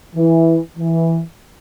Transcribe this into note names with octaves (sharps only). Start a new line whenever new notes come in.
E3
E3